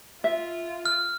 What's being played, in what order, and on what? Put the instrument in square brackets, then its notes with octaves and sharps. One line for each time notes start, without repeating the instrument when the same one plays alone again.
[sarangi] F4 [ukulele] E5
[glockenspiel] F6